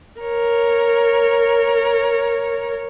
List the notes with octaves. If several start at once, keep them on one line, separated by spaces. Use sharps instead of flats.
A#4 C#5